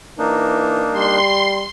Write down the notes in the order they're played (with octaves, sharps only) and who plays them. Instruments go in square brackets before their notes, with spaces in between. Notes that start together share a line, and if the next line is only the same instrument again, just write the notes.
[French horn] E3 [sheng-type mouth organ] A#3 D4 D#4
[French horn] G3 [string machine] C6